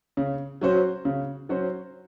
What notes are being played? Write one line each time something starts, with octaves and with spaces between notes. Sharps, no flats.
C#3
F#3 C#4 F#4 C5
C#3
F#3 C#4 F#4 C5